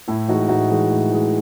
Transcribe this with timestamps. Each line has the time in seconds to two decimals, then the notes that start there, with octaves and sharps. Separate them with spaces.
0.08 A2 E4
0.28 E3 D#4 F#4
0.34 G#3
0.49 A2 D#4 F#4
0.70 E3 G#3
0.91 A2
1.11 E3 G#3